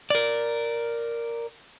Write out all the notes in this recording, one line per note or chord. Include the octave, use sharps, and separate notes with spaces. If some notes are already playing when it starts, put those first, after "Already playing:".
A#4 D5